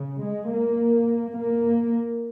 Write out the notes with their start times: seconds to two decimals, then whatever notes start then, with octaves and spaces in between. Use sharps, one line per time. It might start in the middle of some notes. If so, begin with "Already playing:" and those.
Already playing: C#3
0.24 G#3
0.52 A#3
1.37 A#3